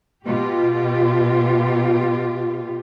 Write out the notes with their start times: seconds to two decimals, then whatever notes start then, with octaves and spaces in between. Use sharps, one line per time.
0.25 B2 F4 G4